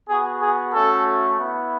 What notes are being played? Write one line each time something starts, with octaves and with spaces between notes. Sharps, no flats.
B3 F#4 G#4
G#4
A3 C#4 F#4 A4
B3 E4